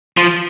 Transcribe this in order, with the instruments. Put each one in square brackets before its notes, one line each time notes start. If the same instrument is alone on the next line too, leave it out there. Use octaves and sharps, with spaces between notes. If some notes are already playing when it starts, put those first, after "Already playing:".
[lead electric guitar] F3